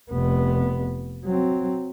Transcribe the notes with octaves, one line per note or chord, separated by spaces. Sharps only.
F1 B3
F#3 C4